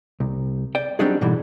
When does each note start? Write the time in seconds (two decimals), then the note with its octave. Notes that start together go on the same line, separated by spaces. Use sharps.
0.20 C2
0.75 D5 G5
0.99 F#3 G3 C4 D4 D#4 G#4
1.21 G#2 B2 D3 E3 G3